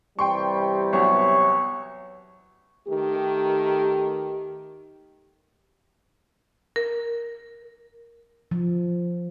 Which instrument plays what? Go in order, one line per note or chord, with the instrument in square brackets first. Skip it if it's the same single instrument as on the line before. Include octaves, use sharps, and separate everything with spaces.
[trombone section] C3 E3 G3 [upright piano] G5 C6 C#6
[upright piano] C2 F#3 B3 [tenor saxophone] C#5
[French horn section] D#3 A3 G4
[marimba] A#4
[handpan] F3